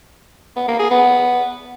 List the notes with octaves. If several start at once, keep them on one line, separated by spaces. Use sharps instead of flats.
B3
A#3
G#4
B3